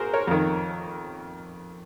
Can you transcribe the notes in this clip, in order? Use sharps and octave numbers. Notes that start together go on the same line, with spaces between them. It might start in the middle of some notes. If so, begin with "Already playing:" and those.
Already playing: F#4 G#4 A#4 C5
A#4 C#5
F2 D#3